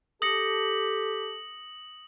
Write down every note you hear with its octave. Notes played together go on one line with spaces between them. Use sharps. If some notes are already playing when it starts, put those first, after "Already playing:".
G4 A4 D#6 A#6 C#7 F#7